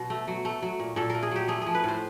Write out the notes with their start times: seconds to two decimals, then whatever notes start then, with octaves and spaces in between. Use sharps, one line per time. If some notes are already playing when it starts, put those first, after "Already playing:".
Already playing: B2 F#3
0.10 A3
0.28 F#3
0.45 A3
0.62 F#3
0.80 A#2
0.96 A#2 A4
1.10 A3 A#4
1.23 G#4
1.31 F#3 G4
1.48 A3 G#4
1.62 F3 G#4
1.75 B4
1.84 A2 C5